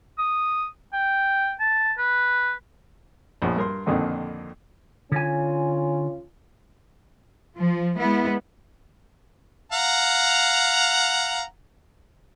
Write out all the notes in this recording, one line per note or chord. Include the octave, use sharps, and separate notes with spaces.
D#6
G5
A5
B4
A#1 F3 B3
G2 A#4 C6
F2 A#2 D3 D#3 C4
D3 C#4 F4 G#5
F3
G#3 B3 E4
F5 F#5 A#5